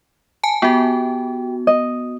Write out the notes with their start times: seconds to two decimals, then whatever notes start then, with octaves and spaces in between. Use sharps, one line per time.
0.43 G#5 A5
0.62 B3 F#4 G4
1.67 D#5